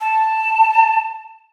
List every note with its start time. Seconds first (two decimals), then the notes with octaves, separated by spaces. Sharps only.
0.01 A5